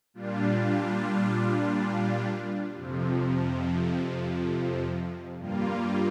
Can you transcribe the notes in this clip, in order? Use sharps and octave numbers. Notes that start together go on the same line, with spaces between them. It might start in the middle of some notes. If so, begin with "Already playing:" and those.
A#2 G3 D4 F4
F2 C3 F3
G2 G3 A#3 F4